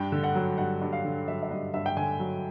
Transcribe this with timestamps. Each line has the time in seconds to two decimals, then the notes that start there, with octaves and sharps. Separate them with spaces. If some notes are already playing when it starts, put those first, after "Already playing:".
Already playing: G2 G5
0.12 D3
0.24 F#5
0.35 F#3
0.58 G2 F#5
0.81 G2
0.93 F5
1.05 D3
1.28 F#3 E5
1.43 E5
1.50 G2 D#5
1.74 G2 E5
1.86 G5
1.97 D3 G#5
2.20 F#3